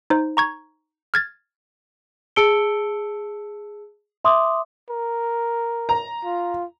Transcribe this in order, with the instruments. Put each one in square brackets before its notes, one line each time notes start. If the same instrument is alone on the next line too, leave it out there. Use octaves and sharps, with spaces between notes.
[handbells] D#4 C5
A#5 C#6 G#6
F6 G#6 A6
[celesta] G#4 A5 E6 C#7 D7 G7
E5 C6 D6 D#6
[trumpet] A#4
[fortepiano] A#5
[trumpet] F4